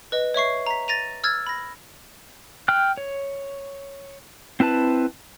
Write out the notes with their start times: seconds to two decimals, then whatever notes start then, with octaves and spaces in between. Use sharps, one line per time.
0.12 B4 D#5
0.34 C#5 E5 C#6 C7
0.66 A#5 B6
0.88 A6 A#6 D#7 F7
1.24 E6 F6 G#6 A6
1.46 B5 A#6
2.68 G5 F6 F#6
2.97 C#5
4.60 C4 E4 B4 A5